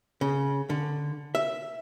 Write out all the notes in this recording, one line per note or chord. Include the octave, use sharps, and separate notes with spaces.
C#3
D3
E5